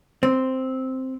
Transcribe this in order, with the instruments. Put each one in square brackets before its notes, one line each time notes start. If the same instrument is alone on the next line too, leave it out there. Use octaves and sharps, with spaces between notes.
[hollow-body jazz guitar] C4